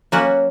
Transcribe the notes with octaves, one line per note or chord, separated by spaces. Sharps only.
F#3 A#3 C#4 F#4